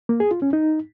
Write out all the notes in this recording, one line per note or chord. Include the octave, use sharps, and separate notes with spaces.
A#3
G#4
F4
C#4
D#4